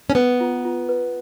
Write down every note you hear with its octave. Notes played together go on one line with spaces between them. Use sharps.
C#4
B3 B4
F4
F4
B4